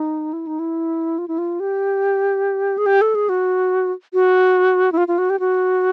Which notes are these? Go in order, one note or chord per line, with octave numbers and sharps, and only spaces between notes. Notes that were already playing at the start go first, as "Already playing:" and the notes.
Already playing: D#4
E4
D#4
E4
F4
E4
F4
G4
G#4
G4
A4
G#4
F#4
F#4
E4
F4
F4
F#4
G4
F#4